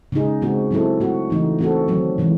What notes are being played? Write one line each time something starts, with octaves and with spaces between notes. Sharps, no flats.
C#3 G#3 D#4 G#4
C#3 G#3 C4 F#4
F#3 C4 E4 A4
A3 C4 F#4
C#3 E3 A3 D#4
A3 C4 F#4 A4
D#3 F#3 C4
C3 E3 G#3